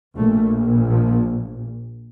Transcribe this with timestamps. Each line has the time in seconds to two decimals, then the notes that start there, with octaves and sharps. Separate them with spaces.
0.18 A#1 A#2 A3
0.90 F3